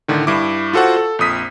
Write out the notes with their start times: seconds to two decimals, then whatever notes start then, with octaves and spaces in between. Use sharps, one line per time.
0.08 A2 D3 D#3
0.27 G2 E4 D6
0.73 F4 F#4 A4 C5 F#5
0.96 A4
1.19 A#1 F2 D#6 B6